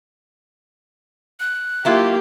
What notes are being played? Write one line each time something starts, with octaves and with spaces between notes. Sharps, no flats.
F#6
F#3 A#3 E4 F4 G4